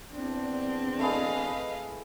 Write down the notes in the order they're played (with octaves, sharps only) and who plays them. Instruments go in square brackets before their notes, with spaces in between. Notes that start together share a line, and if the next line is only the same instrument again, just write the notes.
[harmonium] E2 D4 [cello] C4
[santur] A3 E4 G#4 [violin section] B4 D#5 F5